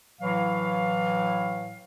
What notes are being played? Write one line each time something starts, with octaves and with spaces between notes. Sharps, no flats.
A2 E3 F#3 F5